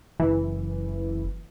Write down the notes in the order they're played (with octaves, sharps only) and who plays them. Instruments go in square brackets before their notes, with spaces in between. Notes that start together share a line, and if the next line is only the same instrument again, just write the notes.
[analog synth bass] F#1 [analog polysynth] E3